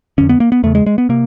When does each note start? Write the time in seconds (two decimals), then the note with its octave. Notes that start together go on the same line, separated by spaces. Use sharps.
0.18 F2 D3 C#4
0.29 B3
0.40 A#3
0.52 B3
0.63 E2 C#3 A3
0.75 G#3
0.86 G#3
0.98 B3
1.09 C3 A#3